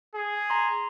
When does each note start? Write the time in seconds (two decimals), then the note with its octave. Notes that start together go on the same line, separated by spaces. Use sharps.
0.15 G#4
0.50 A#5 C6